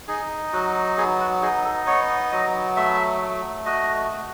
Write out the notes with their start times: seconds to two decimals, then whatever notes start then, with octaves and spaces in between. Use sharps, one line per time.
0.08 D#4 G#4
0.53 F#3 F#4
0.97 B3 G#4
1.20 F#4
1.42 D#4 G#4
1.65 A4
1.87 B3 C#5
2.32 F#3 D#5
2.77 A3 E5
3.21 A3
3.66 F#4 D#5
4.11 F#4